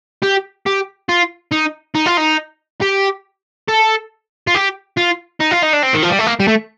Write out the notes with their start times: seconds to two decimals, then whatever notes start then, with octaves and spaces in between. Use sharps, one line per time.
0.23 G4
0.66 G4
1.09 F4
1.52 D#4
1.95 D#4
2.06 F4
2.17 D#4
2.82 G4
3.68 A4
4.47 F4
4.55 G4
4.97 F4
5.40 D#4
5.51 F4
5.63 D#4
5.73 D4
5.83 C4
5.94 D#3
6.03 F3
6.10 G3
6.19 A3
6.27 A#3
6.40 G3
6.48 A3